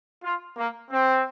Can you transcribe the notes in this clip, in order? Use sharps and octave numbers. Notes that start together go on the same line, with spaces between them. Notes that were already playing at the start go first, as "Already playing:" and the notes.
F4
A#3
C4